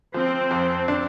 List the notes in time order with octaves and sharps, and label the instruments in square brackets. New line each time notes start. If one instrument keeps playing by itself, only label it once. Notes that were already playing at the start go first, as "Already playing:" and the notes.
[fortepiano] F3 [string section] C4
[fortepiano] F2
D4